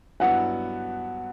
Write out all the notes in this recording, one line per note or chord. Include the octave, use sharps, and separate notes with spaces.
G2 F#3 B3 E4 F#5